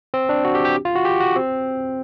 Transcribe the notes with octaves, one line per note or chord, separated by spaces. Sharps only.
C4
D4
F#4
G4
G4
F4
F#4
G4
F#4
C4